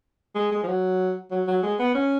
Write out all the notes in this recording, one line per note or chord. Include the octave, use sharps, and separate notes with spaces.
G#3
G#3
F3
F#3
F#3
F#3
G#3
B3
C#4